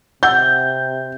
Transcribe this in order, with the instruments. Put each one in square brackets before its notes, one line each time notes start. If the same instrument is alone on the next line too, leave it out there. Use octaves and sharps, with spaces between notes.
[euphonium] C3 [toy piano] D#5 F#5 E6 [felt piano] G6